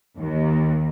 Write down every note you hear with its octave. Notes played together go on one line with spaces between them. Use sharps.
D#2